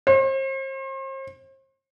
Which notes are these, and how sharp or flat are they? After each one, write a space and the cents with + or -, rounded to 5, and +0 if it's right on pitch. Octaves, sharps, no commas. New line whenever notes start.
C5 +40